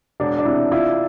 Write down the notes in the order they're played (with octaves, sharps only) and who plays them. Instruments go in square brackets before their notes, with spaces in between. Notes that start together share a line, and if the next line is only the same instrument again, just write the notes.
[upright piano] E1 [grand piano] D4
[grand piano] D4
[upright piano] C3 [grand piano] E4
[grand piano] E4 [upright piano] F4